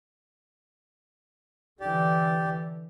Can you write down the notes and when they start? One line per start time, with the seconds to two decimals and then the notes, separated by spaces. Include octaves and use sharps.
1.80 D3 E3 G4 D5